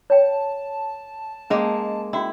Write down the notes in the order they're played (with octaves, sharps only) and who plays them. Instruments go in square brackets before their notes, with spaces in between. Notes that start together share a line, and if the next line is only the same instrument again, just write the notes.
[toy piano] C#5 G5 [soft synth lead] A5
[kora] G#3 A#3 [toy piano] C#4 G#4
[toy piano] C#4 F#4 G5 [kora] E4